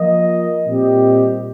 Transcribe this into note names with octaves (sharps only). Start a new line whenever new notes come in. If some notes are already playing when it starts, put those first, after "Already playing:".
Already playing: F3 A#3 F4 D#5
A#2 G3 C4 G4 D#5